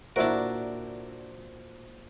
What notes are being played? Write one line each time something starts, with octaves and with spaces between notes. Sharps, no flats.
A#2 D4 E4 F#4 A#4 C5